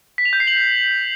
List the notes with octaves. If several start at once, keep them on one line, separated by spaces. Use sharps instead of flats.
B6
F7
G6
C7
F#7